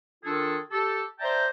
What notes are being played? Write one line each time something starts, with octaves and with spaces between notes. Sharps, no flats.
D#3 D4 F4 G#4 A4
G4 A4
C5 D5 E5 G5 A5 A#5